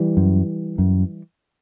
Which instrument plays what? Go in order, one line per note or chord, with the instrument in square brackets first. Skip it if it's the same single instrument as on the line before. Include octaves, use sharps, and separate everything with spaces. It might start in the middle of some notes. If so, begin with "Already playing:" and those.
Already playing: [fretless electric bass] E3 G3
F#2
F#2